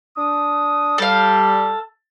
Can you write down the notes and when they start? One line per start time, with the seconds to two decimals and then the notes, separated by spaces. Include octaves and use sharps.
0.16 D4 D#6
0.98 G3 A4 F5